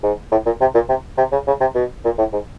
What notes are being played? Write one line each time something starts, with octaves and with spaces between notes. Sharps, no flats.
G#2
A2
A#2
C3
A#2
C3
C3
C#3
C#3
C3
B2
A#2
A2
G#2